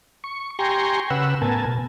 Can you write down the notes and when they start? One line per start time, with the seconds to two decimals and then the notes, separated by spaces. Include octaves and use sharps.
0.24 C#6
0.59 G4 G5 G#5 A#5 C6 C#6
1.10 C#3 B4 F#5 E6
1.42 A2 B3 A#4 G#5 A5
1.66 B2